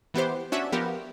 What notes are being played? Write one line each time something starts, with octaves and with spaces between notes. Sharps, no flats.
E3 B3 G4 C5
C#4 D4 F#4 E5
F3 B3 G4 A#4